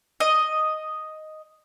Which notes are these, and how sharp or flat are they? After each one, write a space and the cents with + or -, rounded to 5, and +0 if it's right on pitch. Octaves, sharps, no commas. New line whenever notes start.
D#5 +0